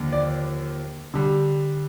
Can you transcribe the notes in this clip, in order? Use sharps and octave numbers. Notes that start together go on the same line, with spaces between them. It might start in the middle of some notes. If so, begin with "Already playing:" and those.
Already playing: D#2 D3 F3
D5
D3 G3